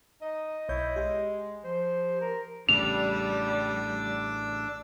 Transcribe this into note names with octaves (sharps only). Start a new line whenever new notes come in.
D#4 D#5
B1 E4 C#5 G6
G#3 G4
F3 C5
A#4
A1 A2 C#3 G3 D4 D6 E6 F7